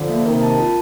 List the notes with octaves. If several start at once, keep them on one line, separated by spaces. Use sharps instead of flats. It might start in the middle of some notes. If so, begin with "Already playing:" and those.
Already playing: D3 F3
A#3
C3 D#3 A#4
A5
F4